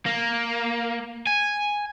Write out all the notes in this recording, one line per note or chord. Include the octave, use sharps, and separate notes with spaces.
A#3
G#5